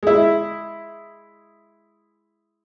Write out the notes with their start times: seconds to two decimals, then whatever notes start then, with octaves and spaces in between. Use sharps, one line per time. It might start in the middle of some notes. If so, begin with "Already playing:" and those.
0.03 G#3 E4